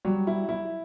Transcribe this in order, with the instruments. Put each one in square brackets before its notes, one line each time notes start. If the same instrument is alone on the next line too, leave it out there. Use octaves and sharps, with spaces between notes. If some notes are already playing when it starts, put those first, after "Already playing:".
[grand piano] F#3 [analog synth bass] G3
[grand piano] E4
E4